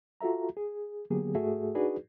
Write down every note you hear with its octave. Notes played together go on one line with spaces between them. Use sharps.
F4 F#4 A4 E5 A#5
G#4
D3 F#3 A#3 B3 G4 G#4
G#2 A3 F#4 G#4 A4 E5
D4 D#4 F#4 G#4 B4 D5